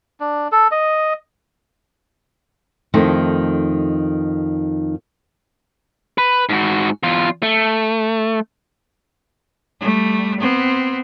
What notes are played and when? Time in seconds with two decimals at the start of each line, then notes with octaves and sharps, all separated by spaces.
0.20 D4
0.52 A4
0.71 D#5
2.94 F2 D#3 A3 D#4
6.18 B4
6.49 G#2 F#4
7.03 E2 F4
7.43 A3
9.81 G3 A3
10.40 B3 C4